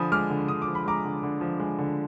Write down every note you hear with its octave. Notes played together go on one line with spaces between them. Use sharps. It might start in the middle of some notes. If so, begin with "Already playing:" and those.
Already playing: D3 F3 G#5 B5 D#6
G#3 D6 F6
D3
D3 D#6
D6
F3
B5
G#3 A#5 D6
D3
D3
F3
G#3
D3